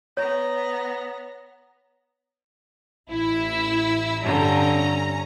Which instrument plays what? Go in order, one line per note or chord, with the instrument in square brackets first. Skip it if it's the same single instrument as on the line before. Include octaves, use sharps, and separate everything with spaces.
[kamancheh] B3 A#5 [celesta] C#5
[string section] A1 E4 E6
[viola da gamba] G2 D3 [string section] C#4 A#5